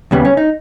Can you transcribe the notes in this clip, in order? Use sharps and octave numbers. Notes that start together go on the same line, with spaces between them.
D#2 C#3 G3 B3
C#4
D#4